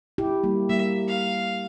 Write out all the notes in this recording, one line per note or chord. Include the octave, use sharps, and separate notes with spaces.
E4 G4
G3 A#3
G3 A#3 E5
F5